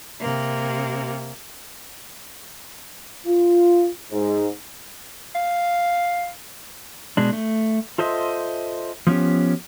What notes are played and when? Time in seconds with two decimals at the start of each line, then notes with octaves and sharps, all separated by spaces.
0.22 C3 A#3
3.27 F4
4.12 G#2
5.35 F5
7.17 B2 G#3 D4
7.33 A3
7.98 F4 A4 C5 D#5 E5
9.07 F3 B3 C#4 G4